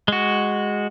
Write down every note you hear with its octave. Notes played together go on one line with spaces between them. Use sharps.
G#3 F#4